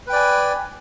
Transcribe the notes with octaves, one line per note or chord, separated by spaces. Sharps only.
B4 D5 G5 G#5